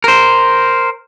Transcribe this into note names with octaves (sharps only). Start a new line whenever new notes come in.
A#4 C5